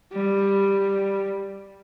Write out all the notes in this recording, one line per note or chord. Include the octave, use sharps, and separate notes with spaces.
G3